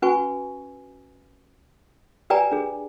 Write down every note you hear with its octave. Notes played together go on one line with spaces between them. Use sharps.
C#4 F#4 B4 G#5 C#6
G4 B4 D5 G5 G#5 A#5
D4 G#4